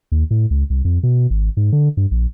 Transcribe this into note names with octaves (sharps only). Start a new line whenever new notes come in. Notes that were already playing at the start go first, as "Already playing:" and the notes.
D#2
A2
C#2
C2
F2
B2
G#1
G#2
D3
G2
A#1